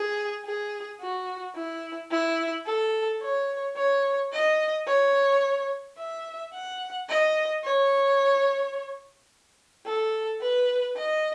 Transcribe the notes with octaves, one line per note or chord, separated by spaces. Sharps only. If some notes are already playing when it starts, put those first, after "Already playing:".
Already playing: G#4
G#4
F#4
E4
E4
A4
C#5
C#5
D#5
C#5
E5
F#5
D#5
C#5
A4
B4
D#5